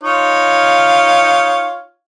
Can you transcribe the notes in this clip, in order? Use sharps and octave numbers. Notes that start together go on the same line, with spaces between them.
D#4 F4 C#5